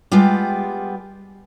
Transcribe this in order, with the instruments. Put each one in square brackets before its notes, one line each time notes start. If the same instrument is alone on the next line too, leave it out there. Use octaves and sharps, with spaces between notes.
[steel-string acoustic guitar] G3 G#3 B3 F4 G4